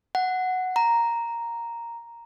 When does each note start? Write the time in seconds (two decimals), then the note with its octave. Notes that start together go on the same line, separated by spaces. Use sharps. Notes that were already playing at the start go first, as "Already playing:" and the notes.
0.15 F#5
0.76 A#5